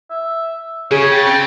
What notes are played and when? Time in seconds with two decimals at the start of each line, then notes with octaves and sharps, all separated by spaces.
0.10 E5
0.91 C#3 G#4 C#5
1.11 G5 A6
1.26 C4